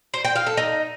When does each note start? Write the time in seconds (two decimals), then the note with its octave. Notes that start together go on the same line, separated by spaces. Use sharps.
0.14 C5
0.25 G5
0.36 F5
0.46 A4
0.57 D#4